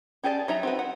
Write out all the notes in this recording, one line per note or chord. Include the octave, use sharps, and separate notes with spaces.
C#4 G4 G#4 D5 A5
F#3 D#4 E5 A#5
C4 F#4 B4
F#5